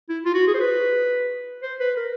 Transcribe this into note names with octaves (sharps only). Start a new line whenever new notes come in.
E4
F4
F#4
G#4
C5
B4
C5
B4
A#4